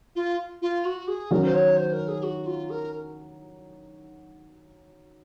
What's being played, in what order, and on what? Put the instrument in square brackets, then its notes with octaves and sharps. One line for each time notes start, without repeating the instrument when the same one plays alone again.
[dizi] F4
F4
F#4
G#4
[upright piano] D#3 F#3 C#4 F#4 [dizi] A#4
[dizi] C5
C#5
C5
A#4
G#4
F#4
F4
A#4